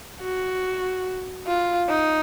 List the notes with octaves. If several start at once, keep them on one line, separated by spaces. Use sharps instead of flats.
F#4
F4
D#4